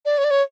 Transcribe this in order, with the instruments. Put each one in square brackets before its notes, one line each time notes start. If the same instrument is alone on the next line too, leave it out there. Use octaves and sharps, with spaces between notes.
[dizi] D5
C#5
D5
C#5